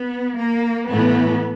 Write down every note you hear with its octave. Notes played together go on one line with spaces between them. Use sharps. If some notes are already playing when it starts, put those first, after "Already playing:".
Already playing: B3
A#3
A2 E3 A3 B3